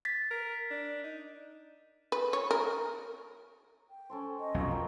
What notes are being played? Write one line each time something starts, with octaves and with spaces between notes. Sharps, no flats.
A6 B6
A#4
D4
D#4
B4
C#5
A#4
G5
C#4 A4 C5
C#5 D#5
B1 F2 F#3 C#4 F4 A#5
A#4 B4 G5